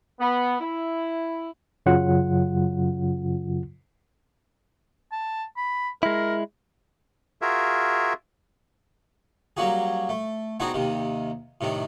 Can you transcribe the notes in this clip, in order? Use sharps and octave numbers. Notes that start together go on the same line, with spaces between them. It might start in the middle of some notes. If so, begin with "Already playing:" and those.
B3
E4
F#2 C#3 F#3 F4 F#5
A5
B5
G#3 E4 A#4
F4 F#4 G#4 A#4 E5
F#3 G3 A#3 C#4 F#4 G#4
A3
B3 C4 D4 D#4 F#4 G#4
D#2 C3 D#3
A2 C3 D#3 D4